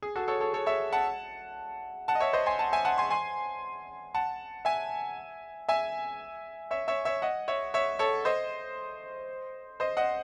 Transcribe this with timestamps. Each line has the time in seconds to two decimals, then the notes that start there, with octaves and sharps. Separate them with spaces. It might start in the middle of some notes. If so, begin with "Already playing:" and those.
0.02 G#4
0.16 F#4 A4
0.28 A4 C#5
0.40 A4 C#5
0.54 A4 C#5
0.66 C#5 E5
0.93 F#5 A5
2.08 F#5 A5
2.15 D#5
2.20 C#5 E5
2.33 C5 D#5
2.46 G#5 C6
2.59 F#5 A5
2.72 E5 G#5
2.85 F#5 A5
2.98 G#5 C6
3.10 G#5 C6
4.14 F#5 A5
4.65 E5 G#5
5.69 E5 G#5
6.71 C#5 E5
6.88 C#5 E5
7.05 C#5 E5
7.22 D#5 F#5
7.48 C#5 E5
7.74 C#5 E5
7.99 A4 C#5
8.25 C5 D#5
9.80 C5 D#5
9.97 D#5 F#5